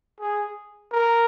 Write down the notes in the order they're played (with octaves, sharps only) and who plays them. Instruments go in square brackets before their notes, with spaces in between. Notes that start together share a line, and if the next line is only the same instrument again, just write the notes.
[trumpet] G#4
A#4